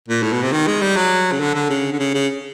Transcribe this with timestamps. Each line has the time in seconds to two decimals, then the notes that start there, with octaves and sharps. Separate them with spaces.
0.08 A#2
0.23 A2
0.32 B2
0.43 C3
0.52 D#3
0.67 G#3
0.81 G3
0.96 F#3
1.32 C#3
1.40 D3
1.55 D3
1.70 C#3
1.93 D3
1.99 C#3
2.14 C#3